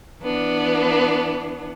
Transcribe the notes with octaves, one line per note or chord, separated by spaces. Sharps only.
E3 B3 D4